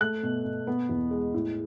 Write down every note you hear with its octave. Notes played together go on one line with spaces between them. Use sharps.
A3 F#6
B2
B2
B3
E2
G#3
A2